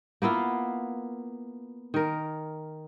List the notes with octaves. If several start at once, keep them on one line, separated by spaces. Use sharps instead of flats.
A#3 B3 E4 F4
D#3 A#4